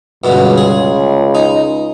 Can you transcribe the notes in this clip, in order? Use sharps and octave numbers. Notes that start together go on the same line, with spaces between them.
C#2 G2 B2 D3
G#4
D#4